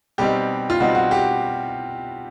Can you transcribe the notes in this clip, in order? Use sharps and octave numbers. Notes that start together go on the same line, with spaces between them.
B2 G3 C4 D#4 G4
F4
B2 G3 C4 D#4 F#4
F#4
G4